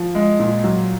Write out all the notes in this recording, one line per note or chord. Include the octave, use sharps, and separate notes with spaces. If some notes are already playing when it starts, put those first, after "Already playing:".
Already playing: F3
G#3
A#2
F#3